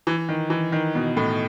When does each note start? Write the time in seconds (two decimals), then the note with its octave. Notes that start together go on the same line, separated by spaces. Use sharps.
0.07 E3
0.29 D#3
0.50 E3
0.72 D#3
0.95 B2
1.17 A2